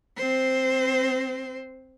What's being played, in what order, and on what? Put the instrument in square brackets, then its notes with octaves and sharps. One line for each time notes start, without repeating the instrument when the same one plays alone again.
[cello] C4 C5